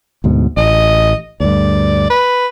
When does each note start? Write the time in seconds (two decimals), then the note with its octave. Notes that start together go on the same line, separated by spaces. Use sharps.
0.24 D2 G#2 B2
0.57 A1 D#5
1.40 D2 G2 D5
2.10 B4